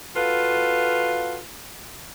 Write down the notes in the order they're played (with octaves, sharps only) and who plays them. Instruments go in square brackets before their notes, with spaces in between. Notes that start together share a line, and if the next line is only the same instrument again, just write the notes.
[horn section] F4 F#4 A4 B4 F5